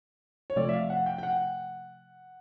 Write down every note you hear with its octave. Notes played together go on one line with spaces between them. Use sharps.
C#5
C3 F3 A3 D5
E5
F5
F#5
G5
G5
F#5